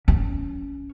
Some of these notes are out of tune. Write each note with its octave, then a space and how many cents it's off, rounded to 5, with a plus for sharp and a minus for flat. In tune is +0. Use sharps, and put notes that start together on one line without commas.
C#4 +15